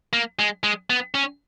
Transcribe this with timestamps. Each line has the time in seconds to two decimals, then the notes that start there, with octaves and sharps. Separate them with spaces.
0.13 A#3
0.39 G#3
0.63 G#3
0.90 B3
1.15 C#4